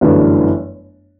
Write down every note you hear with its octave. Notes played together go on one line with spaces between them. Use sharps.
G1 F#2 E3 A3 D4